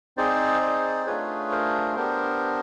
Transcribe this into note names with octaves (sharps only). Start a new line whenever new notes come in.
C4 D#4 G#4 C5 D5
C5 D5
A3 D4 F4 G#4 B4 C#5
A#4 C5
B3 D4 G4 A#4 C5